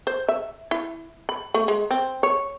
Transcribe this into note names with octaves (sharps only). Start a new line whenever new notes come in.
C5
E5
E4
B5
A3
G#3
C4
C#5